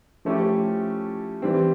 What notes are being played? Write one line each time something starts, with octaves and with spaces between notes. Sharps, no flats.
F3 A3 C#4 E4 G4
E3 G3 C4